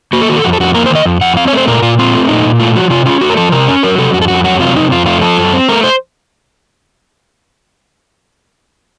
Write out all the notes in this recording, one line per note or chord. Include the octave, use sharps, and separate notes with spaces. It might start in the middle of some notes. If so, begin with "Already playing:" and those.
A#3 F#4
A4
D#3 F#4
A4
F2 F#4
A4
F2 F#4
A#3 A#4
C5
D#3 D#5
F2
F2 F#5
C4 F5
C#5
A3 C5
A#2 A#4
A#2 F4
C4 F4
A3
A#2 D#4
A#2
A3 F4
F3 F#4
C3 F4
C#4 F4
A3 F#4
A#4
F3 A4
C3 A#4
C#4
F#3 A#4
C3 A4
F2 F#4
A4
F2 F#4
F#3 F#4
C3 F4
F2 D#4
F2 F4
A3 F4
F3 A4
F#2
C4
A3 A#4
C5